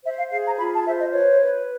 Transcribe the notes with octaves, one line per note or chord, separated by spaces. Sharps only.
C5 E5
F5
G#4 F5
A#5
F4 B5
A5
C5 E5
D#5
B4 C#5
B4